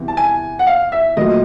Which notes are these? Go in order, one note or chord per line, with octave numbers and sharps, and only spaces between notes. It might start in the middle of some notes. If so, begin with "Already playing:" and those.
Already playing: E2 C3 E3
A5
G#5
F#5
F5
E5
A#2 F#3 A3 D#5